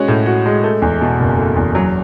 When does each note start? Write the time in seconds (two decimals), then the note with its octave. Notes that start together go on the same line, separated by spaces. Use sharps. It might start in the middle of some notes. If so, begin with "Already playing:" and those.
Already playing: G#3 C#4 F#4
0.08 A2
0.26 F#4
0.46 G#3
0.64 A3
0.82 E2
1.01 B2
1.20 F#1
1.38 A3
1.56 E2
1.75 F#3